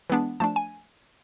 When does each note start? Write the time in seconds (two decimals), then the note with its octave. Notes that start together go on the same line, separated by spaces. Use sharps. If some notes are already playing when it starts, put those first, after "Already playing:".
0.10 E3 G#3 B3 D4
0.40 F3 A3 D4 A5
0.56 G#5